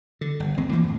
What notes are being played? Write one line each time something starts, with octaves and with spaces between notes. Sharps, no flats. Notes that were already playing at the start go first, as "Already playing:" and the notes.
D3
G1
A#1 D#2 G#3 C4
E3 F3 A#3
F2 A2